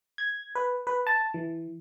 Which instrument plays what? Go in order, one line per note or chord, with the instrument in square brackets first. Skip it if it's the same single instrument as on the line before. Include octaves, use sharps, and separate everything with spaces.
[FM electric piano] G#6
B4
B4
A5
E3